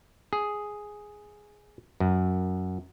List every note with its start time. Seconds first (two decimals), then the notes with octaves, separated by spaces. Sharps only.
0.33 G#4
2.00 F#2